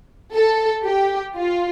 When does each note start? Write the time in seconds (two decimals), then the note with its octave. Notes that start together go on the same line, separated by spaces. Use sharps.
0.33 A4
0.83 G4
1.35 F4